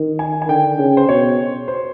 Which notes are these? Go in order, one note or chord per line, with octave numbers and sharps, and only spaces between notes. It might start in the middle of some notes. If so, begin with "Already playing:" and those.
Already playing: D#3
G#5
G#5
D3 G5
C#3
C5
B2 C#5
C5